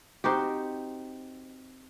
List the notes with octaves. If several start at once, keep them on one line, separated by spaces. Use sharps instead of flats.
C4 D#4 F#4 G4